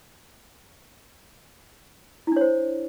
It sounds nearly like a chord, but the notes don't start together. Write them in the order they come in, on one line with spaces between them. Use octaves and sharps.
E4 D4 C#5 C5